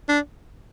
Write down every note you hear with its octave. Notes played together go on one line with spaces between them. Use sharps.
D4